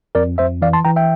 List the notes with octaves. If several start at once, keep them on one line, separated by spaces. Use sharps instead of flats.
F2 A#4 D5
F2 C5 E5
E3 D5 F5
A5 C6
E3 G5 A#5
E5 G5